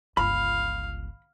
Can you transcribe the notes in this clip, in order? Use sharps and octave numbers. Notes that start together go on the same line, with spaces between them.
G1 C#2 F5 B5